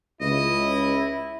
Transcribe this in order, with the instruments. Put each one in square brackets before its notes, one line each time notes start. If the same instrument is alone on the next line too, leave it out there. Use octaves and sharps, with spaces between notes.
[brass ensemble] C#2 [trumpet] E4 [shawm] D#5